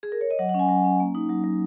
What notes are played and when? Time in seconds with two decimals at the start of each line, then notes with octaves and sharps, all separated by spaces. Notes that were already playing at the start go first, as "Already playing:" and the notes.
0.03 G#4
0.12 A#4
0.21 C#5
0.31 D#5
0.39 F#3 F#5
0.49 F#5
0.54 C#4
0.59 G#5
0.69 F#3
0.84 C#4
1.00 A#3
1.15 D#4
1.29 F#3
1.44 F#3